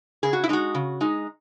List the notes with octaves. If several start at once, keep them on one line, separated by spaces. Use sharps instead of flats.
C#3 G#4
F#4
E4
G#3 D#4 F#4
C#3
G#3 D#4